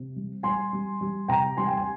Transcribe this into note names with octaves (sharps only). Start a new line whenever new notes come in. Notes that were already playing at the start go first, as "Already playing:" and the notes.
Already playing: C3
G3
G3 G#5 C6
G3
G3
C3 G5 A#5
G3 G#5 C6
G5
G#5